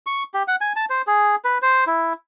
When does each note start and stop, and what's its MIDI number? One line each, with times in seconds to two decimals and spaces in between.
0.06 0.23 85
0.34 0.43 67
0.48 0.56 78
0.61 0.73 80
0.76 0.85 81
0.90 1.02 72
1.07 1.36 68
1.44 1.58 71
1.62 1.84 72
1.87 2.13 64